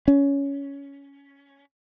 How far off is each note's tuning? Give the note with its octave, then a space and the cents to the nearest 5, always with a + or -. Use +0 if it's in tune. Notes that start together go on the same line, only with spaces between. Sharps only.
C#4 +10